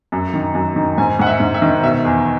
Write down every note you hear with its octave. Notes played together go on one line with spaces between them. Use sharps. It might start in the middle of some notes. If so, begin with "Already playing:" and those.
F#2
D#3
F#2
D#3
G#2 G#5
G#2 F#5
E5
G#2
E5
D#3
B2 E5
E2